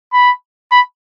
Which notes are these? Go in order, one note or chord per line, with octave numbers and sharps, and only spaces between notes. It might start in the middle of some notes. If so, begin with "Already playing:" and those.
B5
B5